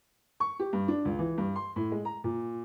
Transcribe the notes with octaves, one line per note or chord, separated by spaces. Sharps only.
C#6
G4
G2
D4
C#2
E3
G2
C6
A2
G#3
A#5
A#2